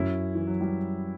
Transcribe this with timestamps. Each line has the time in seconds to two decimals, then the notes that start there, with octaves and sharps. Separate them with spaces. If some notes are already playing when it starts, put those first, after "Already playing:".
Already playing: F#2 C#4 E4
0.35 E3
0.47 F#3
0.61 E3 G3